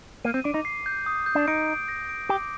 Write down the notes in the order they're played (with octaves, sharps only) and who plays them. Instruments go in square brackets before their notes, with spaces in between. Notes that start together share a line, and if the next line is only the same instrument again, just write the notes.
[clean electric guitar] A#3 [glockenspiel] D#7
[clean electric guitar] C4
[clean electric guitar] D4 [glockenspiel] D6
[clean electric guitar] D#4
[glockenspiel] C7
G6
D#6
G6
[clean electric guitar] D4
[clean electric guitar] D#4 [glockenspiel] D7
[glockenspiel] D7
A#6
D7
[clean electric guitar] G4 [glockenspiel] D6